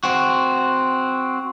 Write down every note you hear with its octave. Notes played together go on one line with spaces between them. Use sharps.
C4 F#4